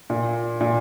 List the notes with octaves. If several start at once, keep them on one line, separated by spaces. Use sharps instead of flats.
A#2
A#2